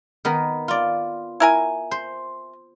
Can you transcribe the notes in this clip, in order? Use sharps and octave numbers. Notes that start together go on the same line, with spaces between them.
D#3 B3 A#4
F4 D5
E4 A#4 G#5
C5